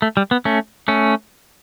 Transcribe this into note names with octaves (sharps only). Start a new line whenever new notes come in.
A3
G3
B3
A3 C#4
A3 C#4